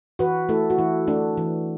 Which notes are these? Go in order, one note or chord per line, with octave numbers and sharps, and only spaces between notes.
E3 F#4 B4
A3 E4 A4
F#4
E3 E4
A3 D4
E3